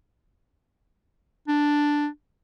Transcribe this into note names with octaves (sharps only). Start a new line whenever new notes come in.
D4